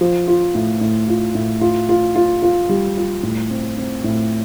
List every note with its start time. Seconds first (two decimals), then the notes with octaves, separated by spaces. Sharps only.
0.01 F3
0.27 F4
0.55 A2
0.81 A2
1.08 F4
1.35 A2
1.61 F4
1.89 F4
2.16 F4
2.42 F4
2.69 G3
2.97 F4
3.23 A2
3.50 C4
3.77 C4
4.04 A2